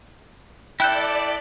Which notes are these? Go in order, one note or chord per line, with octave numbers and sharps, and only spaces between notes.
E4 A4 D5 G5 F#6 G6